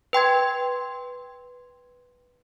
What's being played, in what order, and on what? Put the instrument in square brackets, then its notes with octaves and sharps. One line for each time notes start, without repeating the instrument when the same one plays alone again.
[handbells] B4 G5 C6 G#6